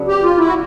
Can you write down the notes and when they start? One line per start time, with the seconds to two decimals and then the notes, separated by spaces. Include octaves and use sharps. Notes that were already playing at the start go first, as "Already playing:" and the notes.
Already playing: C#3 F#3 B3 D4
0.08 G4
0.23 F4
0.38 E4
0.47 F#4